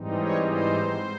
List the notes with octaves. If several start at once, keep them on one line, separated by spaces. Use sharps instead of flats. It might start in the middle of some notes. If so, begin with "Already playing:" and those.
Already playing: G#2 E3 G3 C4 D#4
C#5
C5